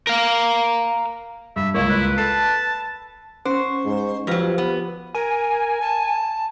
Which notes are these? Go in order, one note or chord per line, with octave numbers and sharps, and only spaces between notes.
A#4 F5
G2 E5
C#2 A#3 E4 C#5
B4
A4 A5 C7
C#4 C5 C#6
G#2
F2 F3 F#3 G4 B4 F6
B3
A#4 G#5
A5